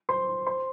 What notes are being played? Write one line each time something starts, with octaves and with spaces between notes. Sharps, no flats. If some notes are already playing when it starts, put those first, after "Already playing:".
C5 C6
C5 C6